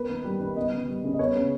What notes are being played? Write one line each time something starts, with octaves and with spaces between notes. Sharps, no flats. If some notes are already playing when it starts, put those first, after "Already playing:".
Already playing: A#3 B3 B4
D#3
G3
D#3
B3 D#5
C#3
G3
C#3
D#5
B3 C#5
C#3